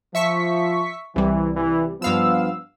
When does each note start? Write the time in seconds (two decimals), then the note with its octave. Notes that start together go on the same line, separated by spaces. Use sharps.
0.15 F3 E5 C#6 B6
1.16 C2 C3 E3 G3
1.56 E3
2.02 G2 F3 B3 F5 E6